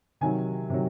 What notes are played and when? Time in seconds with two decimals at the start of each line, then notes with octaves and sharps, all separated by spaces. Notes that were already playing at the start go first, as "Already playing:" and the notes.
0.21 C3 D#3 F#3 G#5
0.70 C3 D#3 F#3